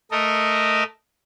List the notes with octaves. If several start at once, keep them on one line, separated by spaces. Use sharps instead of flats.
A3 A4 A#4 D#5